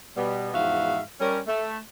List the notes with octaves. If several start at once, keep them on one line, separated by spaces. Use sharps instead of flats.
B2 G3 B3
E2 G#2 F3 F#4 E5 F5
G3 C#4 A#4
A3